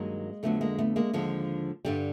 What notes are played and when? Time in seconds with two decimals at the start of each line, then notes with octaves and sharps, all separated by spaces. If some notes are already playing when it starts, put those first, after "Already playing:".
Already playing: G2 D#3 F#3 G#3 A#3
0.43 F2 D3 F#3 A3 B3
0.61 G#3 A#3
0.78 A3 B3
0.96 G#3 A#3
1.13 D#2 D3 F3 G#3
1.85 G2 D3 G3